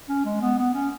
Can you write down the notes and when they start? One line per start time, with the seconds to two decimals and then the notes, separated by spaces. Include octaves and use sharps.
0.09 C#4
0.25 G#3
0.41 B3
0.58 B3
0.73 C#4